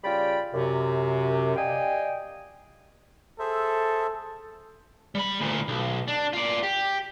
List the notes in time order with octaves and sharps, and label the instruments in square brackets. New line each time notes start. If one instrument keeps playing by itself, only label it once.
[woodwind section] C#3 G3 F4 D5 G5 B5
F#2 C3
G4 D5 D#5 F5 G5 G#5
[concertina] G#4 C5 E5 [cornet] A4
[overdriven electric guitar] G3 B5
D2 A#2
B1
D4
F4 D5
G4